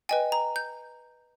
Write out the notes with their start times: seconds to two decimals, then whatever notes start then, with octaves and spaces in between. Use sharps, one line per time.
0.09 B4 D#5 G5 G#5
0.32 A#5
0.56 G6